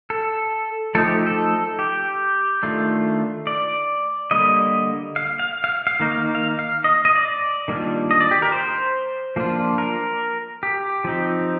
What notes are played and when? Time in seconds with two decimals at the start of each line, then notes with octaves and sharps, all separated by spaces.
0.10 A4
0.95 F3 A3 D#4 A4
1.05 G4
1.27 A4
1.79 G4
2.63 D#3 A3 D4 F4
3.47 D5
4.31 D3 G3 A#3 D#5
5.16 F5
5.39 F5
5.64 F5
5.87 F5
6.00 D#3 A#3 D#4
6.12 F5
6.35 F5
6.59 F5
6.84 D#5
7.05 D#5
7.15 D5
7.68 D#3 G3 A#3 D4 F4
8.11 D#5
8.21 D5
8.31 G4
8.42 A#4
8.52 C5
9.36 F3 A#3 D4 F4
9.78 A#4
10.63 G4
11.04 F3 C4 D#4